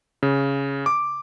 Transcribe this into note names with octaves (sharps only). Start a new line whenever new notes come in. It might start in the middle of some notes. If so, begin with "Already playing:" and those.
C#3
D6